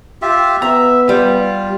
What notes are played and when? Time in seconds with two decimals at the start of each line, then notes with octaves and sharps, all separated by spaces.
0.22 F4 G4 E5
0.62 B3 E5 A#5
1.09 G3 F4